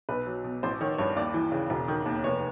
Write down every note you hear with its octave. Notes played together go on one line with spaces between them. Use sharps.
B1 B4
F#3
B2
A1 C5
D#3 C#5
G2 C#5
D#2 D5
E3
C#3
E1
D#3
D#2
F1 C#5